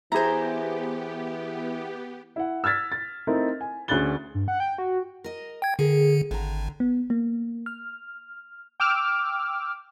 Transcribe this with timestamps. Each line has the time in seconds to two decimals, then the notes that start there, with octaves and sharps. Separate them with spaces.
0.12 E3 B3 E4 G4 G#4 C5 A#5
2.36 E4 F#5
2.64 E6 F6 G#6 A6 B6
2.92 A6
3.27 A3 C4 D#4 E4 A#4
3.61 G#5
3.88 D2 C#4 G#4 F#6 A6 G7
4.35 G2
4.48 F#5
4.60 G5
4.78 F#4
5.24 A#4 D#5
5.62 G5 G#6
5.79 D3 G#4 A#4
6.31 G#1 D3 A#5
6.80 B3
7.10 A#3
7.66 F6
8.80 G5 D6 E6 F6